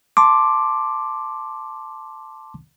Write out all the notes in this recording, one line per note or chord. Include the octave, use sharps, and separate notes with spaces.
A5 C6 D6